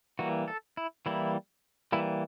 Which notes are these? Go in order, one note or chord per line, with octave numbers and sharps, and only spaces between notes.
E3 G3 A#3 F#4
A4
E4
E3 G3 A#3 E4
E3 G3 A#3 E4